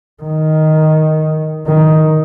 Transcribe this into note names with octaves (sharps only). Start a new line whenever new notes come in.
D#3
D#3